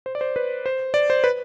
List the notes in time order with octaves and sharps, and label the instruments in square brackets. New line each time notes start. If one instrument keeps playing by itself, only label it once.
[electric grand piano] C5
D5
C5
B4
C5
D5
C5
B4